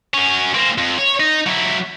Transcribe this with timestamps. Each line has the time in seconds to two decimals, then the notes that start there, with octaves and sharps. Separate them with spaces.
0.14 F#2 C#4
0.54 A#3 C4
0.78 F2
0.98 C#5
1.20 D#4
1.46 F#3 E4